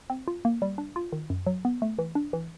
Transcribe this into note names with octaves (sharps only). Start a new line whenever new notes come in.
C4
F4
A#3
G3
D4
F4
D#3
F#2
F#3
B3
A3
E3
D4
E3